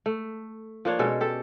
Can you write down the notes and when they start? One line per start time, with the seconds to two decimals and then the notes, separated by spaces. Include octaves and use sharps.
0.06 A3
0.85 F3 A#3 D4 C#5
0.99 B2 G#3 C#4 A4
1.21 G4 A4